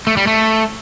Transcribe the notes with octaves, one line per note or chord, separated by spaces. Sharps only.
A3
G3
A3